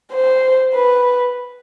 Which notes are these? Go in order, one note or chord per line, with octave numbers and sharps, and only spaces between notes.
C5
B4